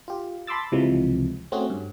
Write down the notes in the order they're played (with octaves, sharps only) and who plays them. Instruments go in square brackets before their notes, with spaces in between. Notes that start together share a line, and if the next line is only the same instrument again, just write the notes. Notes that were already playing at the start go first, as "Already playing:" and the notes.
[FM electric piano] F4 G4
A5 B5 C6 D6 E6 A6
C#2 C3 E3 F3 G#3
A3 C4 C#4 F#4 G#4
G2